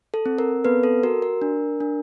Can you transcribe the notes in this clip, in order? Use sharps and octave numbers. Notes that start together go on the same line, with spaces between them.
A4
C4
A#4
B3 A4 B4
A4
F#4 A#4
A#4
D4
D4